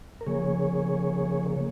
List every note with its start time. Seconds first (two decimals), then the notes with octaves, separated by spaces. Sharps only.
0.21 A#4
0.26 C#3 F3 A#3 G#4 C#5